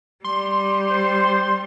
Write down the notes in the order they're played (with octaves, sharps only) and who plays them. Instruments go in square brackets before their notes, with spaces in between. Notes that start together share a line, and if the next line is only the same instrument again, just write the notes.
[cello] G3 [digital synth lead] C6
[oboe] C5